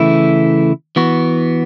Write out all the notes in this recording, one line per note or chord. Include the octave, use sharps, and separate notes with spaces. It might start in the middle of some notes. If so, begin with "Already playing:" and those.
Already playing: C#3 E3 A3 E4
E3 B3 F#4